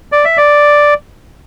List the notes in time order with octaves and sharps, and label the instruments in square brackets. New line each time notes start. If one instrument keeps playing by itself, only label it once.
[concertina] D5
E5
D5